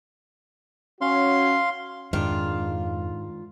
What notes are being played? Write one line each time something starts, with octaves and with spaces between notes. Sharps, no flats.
C#4 F#4 F5 C6
F2 G#2 D#3 D4 F4